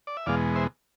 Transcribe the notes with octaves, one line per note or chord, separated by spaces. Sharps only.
D5
E5
E2 B2 G#3 D5 F5
C5 E5